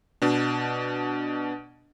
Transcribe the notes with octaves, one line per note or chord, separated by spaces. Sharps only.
B2 D4